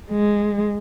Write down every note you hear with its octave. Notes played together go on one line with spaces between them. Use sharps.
G#3